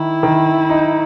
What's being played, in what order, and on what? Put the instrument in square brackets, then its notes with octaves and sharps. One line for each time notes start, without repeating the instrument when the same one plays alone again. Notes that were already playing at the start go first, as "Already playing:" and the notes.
Already playing: [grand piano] D#3 [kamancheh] E4
[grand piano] D#3
D#4